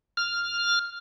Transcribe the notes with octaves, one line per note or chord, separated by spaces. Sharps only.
F6